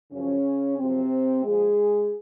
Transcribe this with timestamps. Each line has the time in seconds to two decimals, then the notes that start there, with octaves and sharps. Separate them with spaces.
0.12 F#2 C#3 F3 C#4
0.78 F#2 C3 F3 C4
1.44 A#2 F3 G#3 G#4